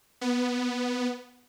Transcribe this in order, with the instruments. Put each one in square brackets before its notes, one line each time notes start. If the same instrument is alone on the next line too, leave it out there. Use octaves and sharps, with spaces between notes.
[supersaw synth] B3